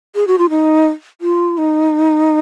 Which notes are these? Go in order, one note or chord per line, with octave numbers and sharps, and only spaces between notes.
G#4
F#4
F4
D#4
F4
D#4